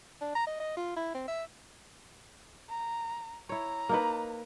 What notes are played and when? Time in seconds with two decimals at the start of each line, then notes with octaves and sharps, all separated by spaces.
0.21 D4
0.35 A#5
0.47 D#5
0.60 D#5
0.77 F4
0.96 E4
1.14 C4
1.28 E5
2.69 A#5
3.49 E4 C#5 A#5
3.89 A#3 D#4 B4